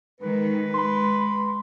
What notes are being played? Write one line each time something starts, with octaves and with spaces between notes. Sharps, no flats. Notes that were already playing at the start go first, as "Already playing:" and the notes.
D#3 G#3 B4
G#3 B5 C6